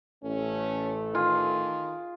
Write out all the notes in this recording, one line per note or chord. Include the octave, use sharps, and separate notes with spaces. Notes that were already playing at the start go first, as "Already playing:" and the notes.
A1 A3 C#4
D#3 F4 G#4